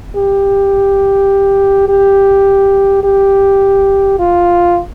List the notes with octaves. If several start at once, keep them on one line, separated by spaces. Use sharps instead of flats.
G4
G4
G4
F4